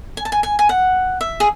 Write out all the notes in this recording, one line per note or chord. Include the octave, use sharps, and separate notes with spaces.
G#5
A5
G#5
G#5
G#5
F#5
E5
G#4